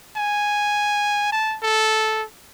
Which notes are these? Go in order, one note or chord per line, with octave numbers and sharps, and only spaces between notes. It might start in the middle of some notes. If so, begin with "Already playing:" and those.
G#5
A5
A4